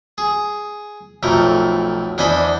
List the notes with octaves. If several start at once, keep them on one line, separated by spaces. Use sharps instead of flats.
G#4
B1 F2 A3 A#4
E2 D4 C5 D#5 G#5 B5